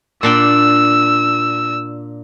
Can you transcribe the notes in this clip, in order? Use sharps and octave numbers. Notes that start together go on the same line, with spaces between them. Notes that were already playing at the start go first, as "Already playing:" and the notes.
A#2 D4 G5 E6